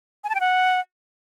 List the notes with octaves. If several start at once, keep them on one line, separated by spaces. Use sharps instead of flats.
G#5
A5
G5
F#5